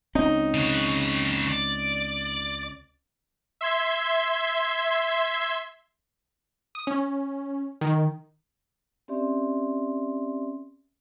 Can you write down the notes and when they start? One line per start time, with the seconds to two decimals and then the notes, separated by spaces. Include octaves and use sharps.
0.15 C#2 C4 C#4 D#4
0.54 C#3 F#4
1.48 D5
3.61 E5 C6 G#6
6.75 D#6
6.87 C#4
7.81 D#3
9.08 C4 C#4 G4 D5 E5 C6